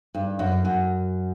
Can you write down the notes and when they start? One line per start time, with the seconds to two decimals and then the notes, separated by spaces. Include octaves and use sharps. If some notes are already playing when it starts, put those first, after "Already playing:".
0.14 G2
0.39 F#2
0.65 F#2